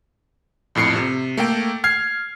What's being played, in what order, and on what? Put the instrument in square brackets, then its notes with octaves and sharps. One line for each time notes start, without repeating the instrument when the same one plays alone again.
[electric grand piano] A#1 F2 A2 C7 C#7
C3
A3 A#3 A4 G5
F6 G#6 C7